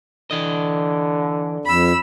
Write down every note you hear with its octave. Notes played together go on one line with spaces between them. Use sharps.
D3 E3 D#5
F2 B5 E6